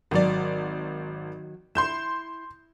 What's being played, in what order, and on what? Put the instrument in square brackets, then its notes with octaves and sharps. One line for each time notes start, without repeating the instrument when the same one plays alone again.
[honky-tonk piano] G#1 D5 [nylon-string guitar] D#3 F#3
[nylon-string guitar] E4 [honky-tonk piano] C6 G6 E7